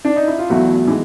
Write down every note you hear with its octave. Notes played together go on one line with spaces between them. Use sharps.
D4
D#4
E4
F4
E2 B2 F#3 A3 E4 F#4
E3 G#3